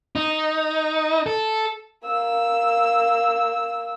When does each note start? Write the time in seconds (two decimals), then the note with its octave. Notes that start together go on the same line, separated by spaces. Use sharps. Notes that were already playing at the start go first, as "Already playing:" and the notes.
0.16 D#4
1.26 A4
2.05 A#3 E6